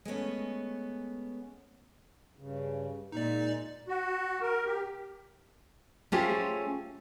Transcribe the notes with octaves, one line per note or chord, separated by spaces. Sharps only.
G#3 A3 B3 C#4
G2 C#3
A#2 G#3 D#4 D5
F#4
A#4
G4
A3 C#4 F4 G4 G#4 C5